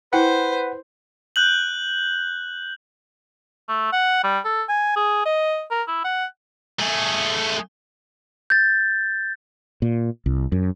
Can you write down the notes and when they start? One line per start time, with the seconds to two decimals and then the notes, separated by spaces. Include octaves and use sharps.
0.13 E4 B4 C5 F#5 G5
1.36 F#6 G6 F#7
3.69 A3
3.93 F#5
4.23 G3
4.45 A4
4.69 G#5
4.96 G#4
5.26 D#5
5.71 A#4
5.88 E4
6.05 F#5
6.79 A3 G#4
8.50 G6 A6
9.82 A#2
10.26 C2
10.52 F#2